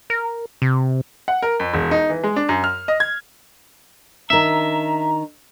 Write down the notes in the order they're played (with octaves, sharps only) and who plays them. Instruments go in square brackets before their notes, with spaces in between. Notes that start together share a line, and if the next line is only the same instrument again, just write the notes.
[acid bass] A#4
C3
[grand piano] F#5
A#4
F2
E1
D#4
E3
G#3
D4
F#2
F6
D#5
G#6
[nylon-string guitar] D#3 D4 [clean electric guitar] E5 [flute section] A#5